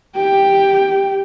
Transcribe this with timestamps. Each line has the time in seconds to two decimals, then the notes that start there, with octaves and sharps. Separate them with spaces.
0.16 G4 G5